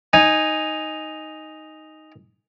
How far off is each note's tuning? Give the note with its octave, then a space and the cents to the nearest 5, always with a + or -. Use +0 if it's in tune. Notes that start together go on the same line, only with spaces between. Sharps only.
D#4 +0 G#5 -10